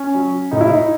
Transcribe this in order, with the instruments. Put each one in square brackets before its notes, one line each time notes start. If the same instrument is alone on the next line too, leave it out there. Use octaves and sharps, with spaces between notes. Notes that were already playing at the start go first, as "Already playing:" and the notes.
Already playing: [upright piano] C#4
F#3
A2 D#4
E4
D#4